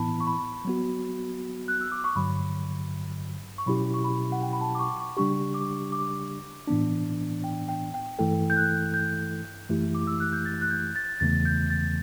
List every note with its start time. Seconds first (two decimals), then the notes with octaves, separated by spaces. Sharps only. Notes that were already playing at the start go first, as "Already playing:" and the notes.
Already playing: A2 E3 B3 E4 A5 B5
0.20 C#6
0.27 B5
0.65 F#3 B3 F#4
1.68 F#6
1.81 E6
1.92 D6
2.04 C#6
2.16 G2 D3 F#3 B5
3.58 C#6
3.66 B2 F#3 C#4 E4 G4 B5
3.94 C#6
4.04 B5
4.32 F#5
4.42 G5
4.53 B5
4.61 A5
4.75 D6
4.79 C#6
4.99 C#6
5.17 C#3 G3 D4 G4 C#6
5.54 D6
5.92 D6
6.67 A2 E3 B3 D4
7.44 G5
7.69 G5
7.94 G5
8.19 G2 E3 A3 E4 A4 G5
8.50 G6
8.57 F#6
8.94 G6
9.70 F#2 E3 A3 E4 G4
9.95 D6
10.07 E6
10.20 F#6
10.33 G6
10.45 A6
10.61 F#6
10.70 G6
10.95 A6
11.20 E2 C#3 E3 A3 A6
11.45 G6
11.70 A6